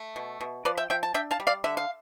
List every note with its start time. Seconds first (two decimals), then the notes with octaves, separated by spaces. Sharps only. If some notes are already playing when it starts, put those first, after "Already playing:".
Already playing: A3
0.16 B2
0.41 B2
0.65 F3 B4 D5
0.77 E5 G5
0.90 F3 E5 G5
1.03 A5
1.14 D4 E5 G5
1.31 F5 A5
1.40 G3
1.47 D5 F5
1.64 D3 E5
1.77 F5